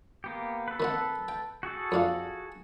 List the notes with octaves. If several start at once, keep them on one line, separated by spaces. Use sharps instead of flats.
A#3 B3 G4
A4 B4
D#3 C4 F#5
G5
F#4 G#4 A4
F2 D4 F5